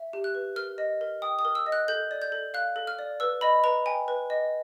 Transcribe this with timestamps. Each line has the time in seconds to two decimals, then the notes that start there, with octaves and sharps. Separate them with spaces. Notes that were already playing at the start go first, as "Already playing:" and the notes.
Already playing: E5
0.13 G4
0.24 F#6
0.35 B4
0.56 A#4 F6
0.78 D#5
1.01 A#4
1.22 G5 D#6
1.39 D#6
1.45 A#4
1.55 E6
1.66 D#5
1.72 F#6
1.88 A4 G6
2.11 D5
2.22 G6
2.32 A4
2.54 F5 F#6
2.76 A4
2.87 F6
2.99 D5
3.20 B4 E6
3.41 D#5 B5
3.64 B4 A#5
3.86 G5 G#5
4.08 B4
4.30 D#5